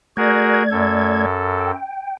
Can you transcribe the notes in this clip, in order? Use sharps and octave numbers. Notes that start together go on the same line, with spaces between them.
A3 F#4 G#4 A#4 D5 G#6
F#2 A4
G5